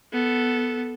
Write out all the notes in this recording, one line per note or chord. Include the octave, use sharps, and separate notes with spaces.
B3 A4